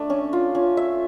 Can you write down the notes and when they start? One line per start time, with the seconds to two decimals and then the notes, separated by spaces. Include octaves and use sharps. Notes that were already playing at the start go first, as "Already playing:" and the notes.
Already playing: A3 D4
0.10 C#4
0.33 F4
0.55 C#4
0.77 E5